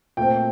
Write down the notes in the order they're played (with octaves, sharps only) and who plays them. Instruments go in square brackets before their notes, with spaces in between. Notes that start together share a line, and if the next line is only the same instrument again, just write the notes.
[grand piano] A#2 A3 C4 G5